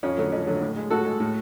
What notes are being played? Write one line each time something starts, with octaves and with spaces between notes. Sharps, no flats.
F2 C#4
D3 F#3 A3
F2
D3 F#3 A3
A2
G#3
A2 F#4 A4
G#3
A2